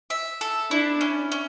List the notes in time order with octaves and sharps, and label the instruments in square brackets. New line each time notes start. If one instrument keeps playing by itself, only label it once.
[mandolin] E5
A4
[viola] D4 [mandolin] E4
[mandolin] C#4
C#4